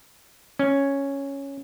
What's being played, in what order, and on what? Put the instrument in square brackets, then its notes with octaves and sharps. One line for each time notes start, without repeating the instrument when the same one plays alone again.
[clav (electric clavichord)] C#4